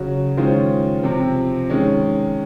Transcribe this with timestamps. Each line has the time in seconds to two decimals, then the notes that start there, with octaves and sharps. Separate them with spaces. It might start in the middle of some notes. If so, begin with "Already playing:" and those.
Already playing: C#3 F#3 C#4 F#4
0.37 D#3 G#3 C#4 F4 C5
1.03 C3 F3 C4
1.70 D#3 G#3 C#4